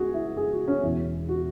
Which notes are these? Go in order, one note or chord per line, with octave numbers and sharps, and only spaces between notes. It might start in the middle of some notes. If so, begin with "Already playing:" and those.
Already playing: C#2 F#4 G#4
E4
G#4
F#4
C#4
E1 E2 E3 E4
F#4